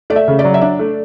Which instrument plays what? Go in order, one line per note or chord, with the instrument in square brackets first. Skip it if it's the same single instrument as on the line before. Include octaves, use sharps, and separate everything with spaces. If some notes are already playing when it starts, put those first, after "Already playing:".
[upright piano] A3 [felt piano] D5
[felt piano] E5
[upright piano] C#3
[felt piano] D5
[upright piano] F#3
[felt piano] E5
[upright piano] D4 [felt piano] D5
[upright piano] A3